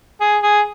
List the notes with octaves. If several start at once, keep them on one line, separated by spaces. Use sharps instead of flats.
G#4
G#4